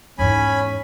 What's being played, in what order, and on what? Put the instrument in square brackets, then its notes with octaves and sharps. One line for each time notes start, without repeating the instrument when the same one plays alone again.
[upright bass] E2 G#2 [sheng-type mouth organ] C#4 G#5 B5